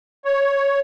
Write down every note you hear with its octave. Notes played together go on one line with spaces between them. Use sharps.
C#5